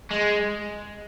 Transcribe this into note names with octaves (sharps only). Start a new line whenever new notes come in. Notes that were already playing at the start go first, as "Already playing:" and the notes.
G#3